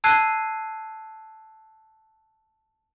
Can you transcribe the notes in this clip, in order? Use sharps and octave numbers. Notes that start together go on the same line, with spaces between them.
A5 E6 F#6 G#6 C7 D#7